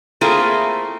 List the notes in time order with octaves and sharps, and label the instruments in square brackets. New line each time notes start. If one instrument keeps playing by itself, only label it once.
[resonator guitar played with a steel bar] A3 A#3 C4 E4 F4 G#4